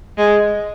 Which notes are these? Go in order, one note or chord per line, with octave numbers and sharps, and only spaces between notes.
G#3